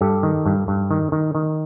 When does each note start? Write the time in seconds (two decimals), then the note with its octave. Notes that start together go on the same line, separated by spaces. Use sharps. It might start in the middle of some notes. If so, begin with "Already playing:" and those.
0.01 G2 G4 A4
0.23 D#3
0.46 G2
0.68 G2
0.91 D#3
1.12 D#3
1.35 D#3